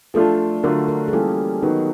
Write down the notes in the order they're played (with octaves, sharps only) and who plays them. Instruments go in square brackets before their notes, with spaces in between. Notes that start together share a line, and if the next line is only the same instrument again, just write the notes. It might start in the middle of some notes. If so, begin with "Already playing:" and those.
[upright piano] F3 A3 D4 F4 [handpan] A4
[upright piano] D3 F#3 A3 D4 F4 [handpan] A#4
[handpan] A#4
G#4
[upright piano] E3 G3 A#3 C#4 F4 [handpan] A4
[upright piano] D#3 F#3 B3 [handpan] D#4